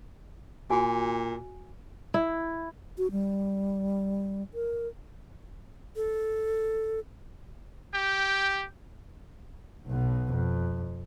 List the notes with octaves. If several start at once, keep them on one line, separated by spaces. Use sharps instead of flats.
A#2 F#4 G#5
E4
F#4
G3
A#4
A4
G4 G5
B1 B2
F2